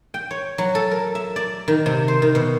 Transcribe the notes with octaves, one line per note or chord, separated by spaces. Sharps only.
G5
C#5
F#3
A4
A#4
E5
D5
D#3
C3
C5
D#3
B2